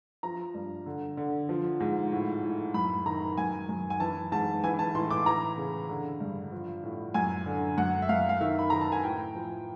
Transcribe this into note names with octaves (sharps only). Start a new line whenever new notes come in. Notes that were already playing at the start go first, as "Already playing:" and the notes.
F3 A#5
G2
D3
D3
F3
G#2
A2
A2
F#2 B5
D#3 A#5
F#2 G#5
F#2
G#5
E3 A5
G#2 A5
E3 G#5
A5
A2 C6
D6
E3 A#5
C#3
D3
G2
F3
A2
F#2 G#5
D3
F#2 F#5
E5
F#2 F5
F5
D#3 E5
B5
D#3 A#5
A5
G#5
A2 G5
F3